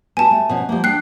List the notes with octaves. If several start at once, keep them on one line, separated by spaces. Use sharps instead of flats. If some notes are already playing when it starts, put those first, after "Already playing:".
B3 F#4 G#5 A5
A3
B2 F3 C#4
F3 G3 A#3
D4 G5 F#6 C7